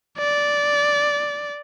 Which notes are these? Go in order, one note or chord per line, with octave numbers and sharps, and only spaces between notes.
D5